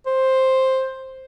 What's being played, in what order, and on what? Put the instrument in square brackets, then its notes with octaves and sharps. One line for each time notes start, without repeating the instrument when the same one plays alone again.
[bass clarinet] C5